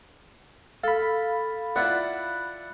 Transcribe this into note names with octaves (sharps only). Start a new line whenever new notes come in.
A4 F5 B5
D4 E4 F4 F#5